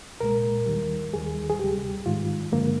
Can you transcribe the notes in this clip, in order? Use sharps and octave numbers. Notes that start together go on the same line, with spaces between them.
C2 A#2 G#3 A#4
D#2 D#3 G3
D#2 D#3 G3 G#4
G#4
D2 C3 G3 G4
G#2 D#3 G#3 F4
G2 D3 F3 G#3 A#3